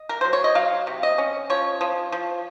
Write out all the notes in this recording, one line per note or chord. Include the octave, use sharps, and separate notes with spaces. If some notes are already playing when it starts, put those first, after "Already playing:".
Already playing: D#5
A#4
F#3 C5
C#5
D#5
F#3 F5
C3
D#5
C#4
F3 C#5
F3
F3